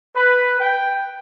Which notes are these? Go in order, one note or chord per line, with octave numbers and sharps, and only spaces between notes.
B4
G5